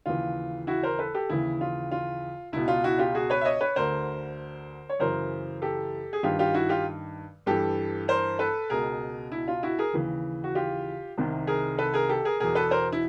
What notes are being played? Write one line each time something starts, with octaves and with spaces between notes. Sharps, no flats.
D#2 C#3 E3 F4
E4 F#4
A#4 C5
A4 B4
G4 A4
D#2 C#3 E3 E4
F4
F4
C#2 B2 E4
F4
E4 F#4
F4 G4
F#4 G#4
B4 C#5
E5
C#5 D#5
B4 C#5
D2 D3 A#4 C5
C#5
F#2 C#3 E3 A#4 C5
G4 A4
G#4
G2 D#3 F4 G4
F4 G4
E4 F#4
F4 G4
G2 E3 G4 A4
A#4 C5
A4 B4
C#2 B2 G#4 A#4
E4
F4
E4 F#4
G#4 A#4
D#2 C#3 E3
F#4
F4 G4
C2 C3 D#3
G#4 A#4
A4 B4
G#4 A#4
G4 A4
G#4 A#4
E2 B2 G#4 A#4
A4 B4
A#4 C5
E4